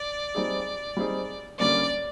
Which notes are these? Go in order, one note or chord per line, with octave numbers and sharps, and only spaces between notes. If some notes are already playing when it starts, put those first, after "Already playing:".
Already playing: D5
G3 C4 D#4 G#4
G3 C4 D#4 G#4
D3 G3 A#3 C#4 D5